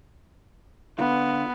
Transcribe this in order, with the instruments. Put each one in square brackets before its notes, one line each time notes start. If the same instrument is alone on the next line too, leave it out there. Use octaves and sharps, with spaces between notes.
[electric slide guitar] D3 F4 [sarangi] B3